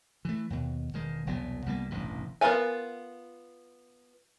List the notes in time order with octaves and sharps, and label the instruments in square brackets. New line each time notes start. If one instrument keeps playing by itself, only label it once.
[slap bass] E3 A3
D#2 B2
E1 D#3 G#3
E1 C2 F#3 B3
C2 G3 A#3 B3
E1 A1 G2 C3
[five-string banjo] B3 F4 A#4 F5 G#5